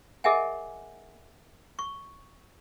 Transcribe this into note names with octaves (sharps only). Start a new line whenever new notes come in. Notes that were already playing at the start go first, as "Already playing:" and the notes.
G#4 A#4 D#5 E5 F#5 G#5
C#6